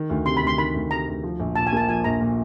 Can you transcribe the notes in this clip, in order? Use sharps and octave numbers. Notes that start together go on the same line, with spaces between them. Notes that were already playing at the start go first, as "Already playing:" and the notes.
Already playing: D#3
D2
C3 C6
B5
D2 C6
D#3 B5
D2
C3 A#5
D2
F3
A#1
A#2 A5
G#5
A#3 A5
F3 G#5
A#1 A#5
A#2